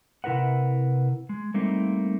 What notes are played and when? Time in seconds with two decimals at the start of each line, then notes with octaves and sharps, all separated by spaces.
0.24 C3 E4 A#4 B4 F#5
1.29 G#3
1.54 G3 A3 A#3 C4 D#4